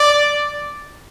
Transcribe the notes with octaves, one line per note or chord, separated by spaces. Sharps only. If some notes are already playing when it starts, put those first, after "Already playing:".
Already playing: D5